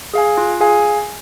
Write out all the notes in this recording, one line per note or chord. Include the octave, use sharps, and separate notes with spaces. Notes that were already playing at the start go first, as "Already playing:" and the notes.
G#4 F5 G#5
F4
G#4 F5 G#5